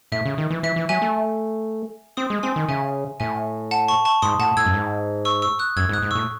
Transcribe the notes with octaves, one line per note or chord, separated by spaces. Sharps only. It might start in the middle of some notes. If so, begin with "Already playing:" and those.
A2 E5
C#3
D#3
E3
E3 E5
E3
F#3 E5 G#5
A3
C4 C6 D#6
G#3
C4 G#5 C6
D#3
C#3 E5 G#5
A2 E5 G#5
F#5 A5
A5 C#6
A5 C#6
G#2 C6 D#6
A2 F#5 A5
A2 E6 G#6
F#2
G#2
C#6 E6
C#6 E6
D#6 F#6
F#2 E6 G#6
G#2
D#6 F#6
G#2
A2 C#6 E6